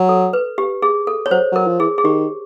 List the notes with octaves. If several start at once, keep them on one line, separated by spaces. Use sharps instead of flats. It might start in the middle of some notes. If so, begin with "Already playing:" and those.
Already playing: F#3
A4
B4
G4
G#4
A4
C#5
F#3 C5
F#3 A#4
F3
E3 G#4
G#4
D#3 G4